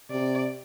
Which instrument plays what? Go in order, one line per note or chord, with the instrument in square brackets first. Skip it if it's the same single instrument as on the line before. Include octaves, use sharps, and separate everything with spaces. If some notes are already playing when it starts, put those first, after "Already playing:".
[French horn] C3 [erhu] D5